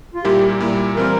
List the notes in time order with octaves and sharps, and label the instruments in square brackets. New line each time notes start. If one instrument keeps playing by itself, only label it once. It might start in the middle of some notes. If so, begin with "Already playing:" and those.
[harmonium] F4
[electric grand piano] A#2 G3 A#3 E4 [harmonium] G4
[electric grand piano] A#2 G3 A#3 E4
[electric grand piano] E3 G3 C4 F4 [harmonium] A#4